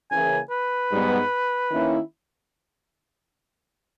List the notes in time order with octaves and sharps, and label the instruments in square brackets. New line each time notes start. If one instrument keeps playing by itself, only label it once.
[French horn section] C#3 E3 A#3 [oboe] G#5
[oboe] B4
[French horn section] G#2 G3 B3
D#3 A#3 C#4 E4